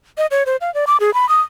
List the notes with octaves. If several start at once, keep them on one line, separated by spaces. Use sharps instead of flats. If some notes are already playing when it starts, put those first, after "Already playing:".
D#5
C#5
C5
F5
D5
D6
G#4
B5
D#6